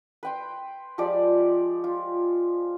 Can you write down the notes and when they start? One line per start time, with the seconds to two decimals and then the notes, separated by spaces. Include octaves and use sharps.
0.23 B4 G5 C6
0.98 F3 G#3 G4 D5
1.84 F4